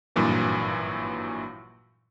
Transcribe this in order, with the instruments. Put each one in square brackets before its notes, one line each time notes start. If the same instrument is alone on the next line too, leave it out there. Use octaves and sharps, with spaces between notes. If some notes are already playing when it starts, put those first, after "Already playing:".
[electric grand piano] G#1 G2 A#2 E3 F#3